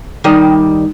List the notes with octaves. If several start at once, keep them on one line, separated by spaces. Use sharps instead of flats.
D#3 G3 D#5